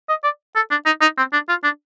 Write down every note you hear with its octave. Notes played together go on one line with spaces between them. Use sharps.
D#5
D5
A4
D4
D#4
D#4
C4
D4
F4
D4